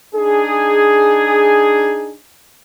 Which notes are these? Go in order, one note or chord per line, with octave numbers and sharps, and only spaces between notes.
D4 D#4 G#4